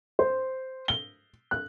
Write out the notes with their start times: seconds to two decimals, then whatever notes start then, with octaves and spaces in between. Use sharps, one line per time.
0.19 C5
0.88 G7
1.51 F#6